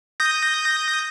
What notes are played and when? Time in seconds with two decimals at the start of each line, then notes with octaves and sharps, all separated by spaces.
0.20 D#6 G6 A#6